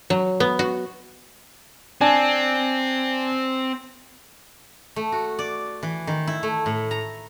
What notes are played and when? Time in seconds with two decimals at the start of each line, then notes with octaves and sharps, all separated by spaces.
0.10 F#3
0.40 B3
0.59 F#4
2.01 C4 D4 G#5
4.96 A3
5.12 F#4
5.39 D5
5.83 E3
6.07 D#3
6.27 E4
6.43 A3
6.66 A2
6.91 A#5